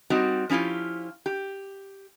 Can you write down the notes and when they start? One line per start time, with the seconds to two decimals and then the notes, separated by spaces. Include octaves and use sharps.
0.10 G3 C4 D#4 F#4
0.49 F3 C#4 E4 F4 G4
1.26 G4